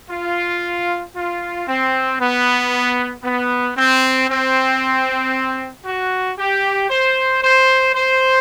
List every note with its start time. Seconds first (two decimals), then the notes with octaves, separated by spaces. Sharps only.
0.10 F4
1.15 F4
1.67 C4
2.20 B3
3.24 B3
3.77 C4
4.29 C4
5.85 F#4
6.38 G4
6.90 C5
7.42 C5
7.94 C5